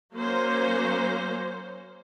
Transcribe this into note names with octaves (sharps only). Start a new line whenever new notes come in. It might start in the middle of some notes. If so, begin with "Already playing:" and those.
F#3 A#3 C#4 C5